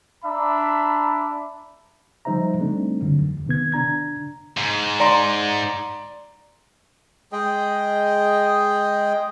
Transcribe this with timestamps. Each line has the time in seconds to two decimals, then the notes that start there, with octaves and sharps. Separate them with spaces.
0.25 D4 E5 A#5 B5
2.25 F3 G3 D#4 C5 E5 A#5
2.59 G3 A3 C4 D4 D#4
3.01 F#2 D3 F#3
3.20 E2
3.46 C3 D#3 B3 G#6
3.72 D4 A#5 G#6
4.57 G#2
5.00 D5 A#5 C6
7.32 G#3 G#4 D#5 G5